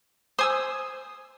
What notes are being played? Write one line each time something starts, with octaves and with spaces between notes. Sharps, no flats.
C5 G#5 D#6 E6